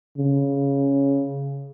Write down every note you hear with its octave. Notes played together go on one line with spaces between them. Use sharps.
C#3